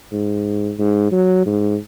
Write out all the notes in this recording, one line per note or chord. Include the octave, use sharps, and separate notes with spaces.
G#2
G#2
F#3
G#2